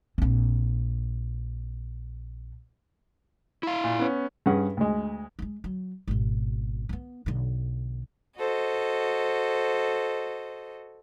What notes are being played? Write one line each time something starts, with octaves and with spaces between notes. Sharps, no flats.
A#1 C4
E4 F5
A#2
B3 C#4
G2 C#4 G#4 F#5
D2 G#3
G#3 A#3
F#3
G#1 B2
A#3 B3
B1 D3
F#4 A4 C5 D#5